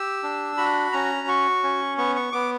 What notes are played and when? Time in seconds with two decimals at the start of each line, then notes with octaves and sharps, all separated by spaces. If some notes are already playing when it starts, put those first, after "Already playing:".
Already playing: G4 E6
0.23 D4
0.58 F#4 B5
0.93 C#4 A#5
1.27 F#4 C#6
1.64 C#4
1.98 B3 C#6
2.16 C#6
2.32 B3 D6